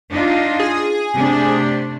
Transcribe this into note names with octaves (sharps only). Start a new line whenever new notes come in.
D4 D#4 F4
G#4
C3 A3 D4